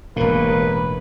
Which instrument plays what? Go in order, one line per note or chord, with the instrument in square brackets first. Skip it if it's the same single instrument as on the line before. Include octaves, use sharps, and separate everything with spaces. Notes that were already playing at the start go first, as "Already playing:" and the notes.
[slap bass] E1 A2 [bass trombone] A#3 [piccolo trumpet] B4